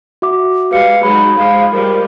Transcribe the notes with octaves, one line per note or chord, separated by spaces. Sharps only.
F#4 E5 D6
G3 G#3 B4 F5 C#7
F#3 G#3 D#4 G#4 B5
F3 G#3 F5
F3 G3 G#3 A#4